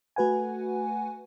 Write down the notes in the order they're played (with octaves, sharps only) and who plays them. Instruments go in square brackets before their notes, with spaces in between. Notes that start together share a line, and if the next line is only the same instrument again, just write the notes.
[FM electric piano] A3 F#4 B4 F#5 G#5